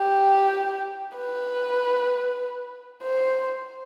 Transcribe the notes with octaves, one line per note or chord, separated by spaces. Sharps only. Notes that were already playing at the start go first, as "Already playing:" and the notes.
Already playing: G4
B4
C5